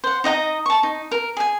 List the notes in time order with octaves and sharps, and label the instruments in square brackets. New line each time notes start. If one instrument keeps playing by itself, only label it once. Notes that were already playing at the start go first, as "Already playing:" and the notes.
[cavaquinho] C5 F#5
D#4 D#5 F#5 A#5
A5 C#6
D#4
A#4
G#4 G#5